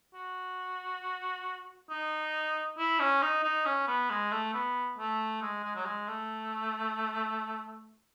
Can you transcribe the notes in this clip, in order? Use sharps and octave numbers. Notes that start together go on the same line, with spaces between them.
F#4
D#4
E4
C#4
D#4
D#4
C#4
B3
G#3
A3
B3
A3
G#3
G#3
F#3
G#3
A3